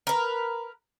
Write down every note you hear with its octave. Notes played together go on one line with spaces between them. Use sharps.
A#4 B4